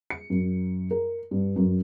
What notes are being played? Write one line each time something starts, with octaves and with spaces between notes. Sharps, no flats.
C#7
F#2
A#4
G2
F#2